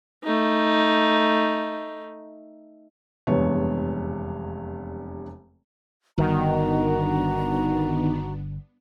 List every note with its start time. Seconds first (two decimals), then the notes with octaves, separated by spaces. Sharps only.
0.23 A3 D#4
3.27 F1 E2 G2 G#3 B3 C#5
6.18 G1 G2 D#3 B3 D4 F#4 A#5